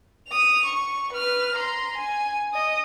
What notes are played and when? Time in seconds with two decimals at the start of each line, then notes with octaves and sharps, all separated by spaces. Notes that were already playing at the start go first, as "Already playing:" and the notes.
0.29 D#6 F7
0.66 C#6
1.13 B4 F6
1.55 A#5 C6
1.97 G#5
2.54 D#5 D#6